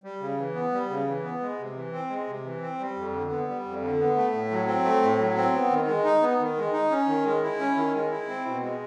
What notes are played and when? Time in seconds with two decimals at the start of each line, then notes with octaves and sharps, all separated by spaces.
0.04 G3
0.21 C#3
0.38 E3
0.55 B3
0.72 G3
0.89 C#3
1.07 E3
1.24 B3
1.40 G#3
1.59 C3
1.75 E3
1.93 C4
2.09 G#3
2.27 C3
2.44 E3
2.61 C4
2.79 G3
2.96 F2
3.13 D3
3.30 B3
3.48 G3
3.64 F2
3.82 D3
3.99 B3
4.16 A3
4.32 A2
4.51 F#3
4.67 C4
4.84 A3
5.02 A2
5.18 F#3
5.36 C4
5.54 B3
5.71 D#3
5.87 G#3
6.04 D#4
6.22 B3
6.39 D#3
6.57 G#3
6.73 D#4
6.91 C#4
7.08 D#3
7.25 G#3
7.43 E4
7.59 C#4
7.76 D#3
7.94 G#3
8.10 E4
8.28 C4
8.46 B2
8.62 G#3